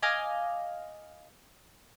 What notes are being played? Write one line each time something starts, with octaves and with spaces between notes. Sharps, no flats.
D#5 F5 G#5 D6